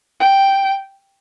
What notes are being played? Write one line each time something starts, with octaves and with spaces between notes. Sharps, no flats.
G5